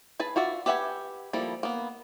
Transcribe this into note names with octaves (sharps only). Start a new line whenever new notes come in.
G#4 B4 A5
F4 F#4 D5 E5
G4 B4 E5 F#5 G#5
F3 G3 A#3 E4 A4
A#3 B3